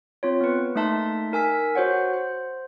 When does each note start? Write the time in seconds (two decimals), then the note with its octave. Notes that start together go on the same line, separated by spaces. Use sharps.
0.23 C4 F4 C#5
0.41 B3 B4
0.76 A3 A#3 D#4 E5 A5 C6
1.32 D#4 A#4 G#5 E6 B6
1.75 F#4 C5 C#5 F#5
2.13 C5